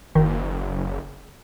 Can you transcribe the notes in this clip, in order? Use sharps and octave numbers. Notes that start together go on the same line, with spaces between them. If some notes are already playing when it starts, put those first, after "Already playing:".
F#1 D#3